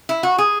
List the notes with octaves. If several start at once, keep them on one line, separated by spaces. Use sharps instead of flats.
E4
F#4
G#4